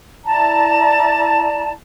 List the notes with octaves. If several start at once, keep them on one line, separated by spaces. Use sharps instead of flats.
E4 D5 A5 A#5